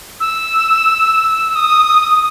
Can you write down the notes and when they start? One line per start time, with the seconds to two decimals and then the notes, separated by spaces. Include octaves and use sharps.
0.20 E6
1.55 D#6